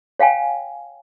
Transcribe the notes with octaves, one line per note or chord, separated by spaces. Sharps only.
C#5 F5 G5 G#5